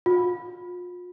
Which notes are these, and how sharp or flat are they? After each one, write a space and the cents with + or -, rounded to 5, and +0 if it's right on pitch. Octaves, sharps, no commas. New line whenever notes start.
F4 +35